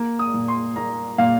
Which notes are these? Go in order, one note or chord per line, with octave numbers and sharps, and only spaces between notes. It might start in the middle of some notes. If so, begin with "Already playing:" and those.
Already playing: A#3
D#6
A#2
C6
A#3 A#5
A#2 F5